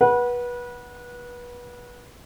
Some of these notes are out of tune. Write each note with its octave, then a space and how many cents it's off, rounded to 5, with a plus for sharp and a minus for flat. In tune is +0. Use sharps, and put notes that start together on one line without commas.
B4 -25 F#5 +0